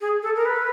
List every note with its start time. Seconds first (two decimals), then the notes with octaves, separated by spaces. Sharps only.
0.01 G#4
0.23 A4
0.36 A#4
0.45 B4